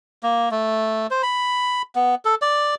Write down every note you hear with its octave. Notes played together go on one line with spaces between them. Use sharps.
A#3
A3
C5
B5
B3
A4
D5